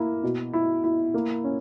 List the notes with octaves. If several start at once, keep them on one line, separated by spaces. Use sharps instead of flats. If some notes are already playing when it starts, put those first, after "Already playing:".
Already playing: A#3 E4
B2
E4
E4
A#3
C#4